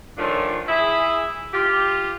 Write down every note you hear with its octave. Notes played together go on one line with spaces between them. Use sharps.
D#3 F3 A3 C#4 D4 F4
E4 G#4 E5
F4 G4